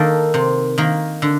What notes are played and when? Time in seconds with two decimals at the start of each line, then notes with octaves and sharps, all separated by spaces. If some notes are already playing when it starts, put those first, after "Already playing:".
Already playing: D#3 A#3 A4
0.34 C3
0.78 D#3 A#3
1.22 D3